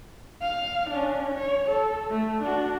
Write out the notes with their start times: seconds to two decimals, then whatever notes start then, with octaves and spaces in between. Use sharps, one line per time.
0.41 F5
0.91 C#4 D4
1.35 C#5
1.69 A4
2.10 A3
2.42 D4 F#4